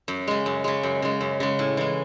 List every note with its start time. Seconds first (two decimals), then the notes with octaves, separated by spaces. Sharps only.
0.08 F#2
0.27 C#3 G#3
0.46 F#2
0.64 C#3 G#3
0.83 F#2
1.02 C#3 G#3
1.21 F#2
1.40 C#3 G#3
1.59 A2
1.77 E3 G#3